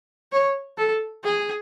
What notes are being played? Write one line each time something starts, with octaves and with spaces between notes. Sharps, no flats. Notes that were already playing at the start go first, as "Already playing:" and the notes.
C#5
A4
G#4